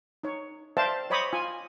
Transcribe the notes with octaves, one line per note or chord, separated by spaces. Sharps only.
D#4 C#5
C5 D5 E5 F5 G5 A5
C5 C#5 D#5 B5 D6 D#6
F4 G#5